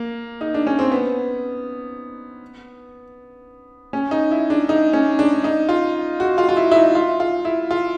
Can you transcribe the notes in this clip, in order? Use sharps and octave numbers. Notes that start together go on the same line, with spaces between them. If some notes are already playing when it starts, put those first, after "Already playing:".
Already playing: A#3
D#4
D4
C#4
C4
B3
C#4
D#4
E4
D4
D#4
C#4
D4
D#4
F4
F#4
F4
F4
E4
E4
D#4
F4
F4
E4
F4